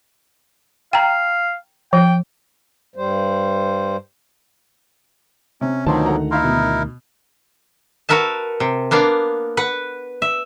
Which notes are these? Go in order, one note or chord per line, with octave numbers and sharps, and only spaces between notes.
F5 G5 A#5
F3 G5
G2 G3 C5
C3 C#4
D2 B2 D#3 F3 F#3 A5 C6
A3 F#5 A#5
D#4 E4 A#4 E5 F5 C6
B2
F#4 A#4 B4 E5 A5
C3
A#3 B3 D4 F5
B4 F#5
E5